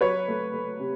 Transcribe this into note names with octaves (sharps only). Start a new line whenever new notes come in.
F#3 B4 C#5
A3
A3
C3